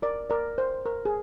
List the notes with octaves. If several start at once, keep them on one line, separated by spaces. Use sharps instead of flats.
A#4 D5
A#4 D5
C5
A#4
G#4